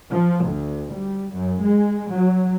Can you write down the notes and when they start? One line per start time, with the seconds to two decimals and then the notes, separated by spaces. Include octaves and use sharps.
0.13 F3
0.45 D2
0.94 G3
1.33 F#2
1.63 G#3
2.13 F#3